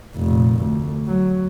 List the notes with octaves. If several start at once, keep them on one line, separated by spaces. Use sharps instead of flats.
F1 A#2
D2
F#3